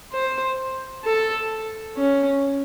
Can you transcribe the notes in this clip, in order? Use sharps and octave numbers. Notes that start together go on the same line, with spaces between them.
C5
A4
C#4